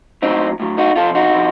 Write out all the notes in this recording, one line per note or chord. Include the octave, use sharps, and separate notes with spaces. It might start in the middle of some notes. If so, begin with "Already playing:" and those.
A2 F#3 C4 D#4
A2 F#3
D#4 F#4
C3 F3 F4 A4
D#4 F#4
C3 F3